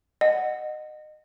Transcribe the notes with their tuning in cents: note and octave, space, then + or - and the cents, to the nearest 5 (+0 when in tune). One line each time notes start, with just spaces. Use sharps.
D#5 -25 F#5 +0